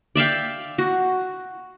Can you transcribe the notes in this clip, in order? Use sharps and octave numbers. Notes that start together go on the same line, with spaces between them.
D5 E5 F5 G5
F#4